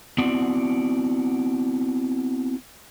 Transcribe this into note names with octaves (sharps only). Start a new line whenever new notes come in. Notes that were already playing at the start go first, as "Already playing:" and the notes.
B3 C4 E4 F#4 D5